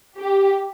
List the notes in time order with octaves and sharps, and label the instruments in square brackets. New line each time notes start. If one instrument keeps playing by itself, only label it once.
[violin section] G4